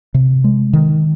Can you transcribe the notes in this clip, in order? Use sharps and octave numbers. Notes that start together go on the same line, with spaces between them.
C3
G#3
D#3